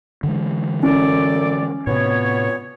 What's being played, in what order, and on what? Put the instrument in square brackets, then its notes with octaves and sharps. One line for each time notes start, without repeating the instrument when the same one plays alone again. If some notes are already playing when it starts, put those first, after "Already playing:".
[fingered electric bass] D3 E3 G#3
[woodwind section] F#2 A4 D5 [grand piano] C#4
[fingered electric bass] A2 C3 [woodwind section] B3 C#5